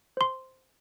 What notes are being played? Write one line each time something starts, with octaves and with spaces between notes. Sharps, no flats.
C5 C6